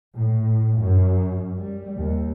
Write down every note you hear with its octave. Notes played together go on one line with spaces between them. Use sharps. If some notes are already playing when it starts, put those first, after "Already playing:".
A2
F#2
G3
D#2